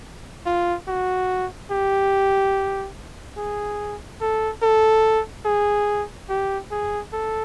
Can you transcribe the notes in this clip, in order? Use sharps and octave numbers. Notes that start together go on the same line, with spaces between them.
F4
F#4
G4
G#4
A4
A4
G#4
G4
G#4
A4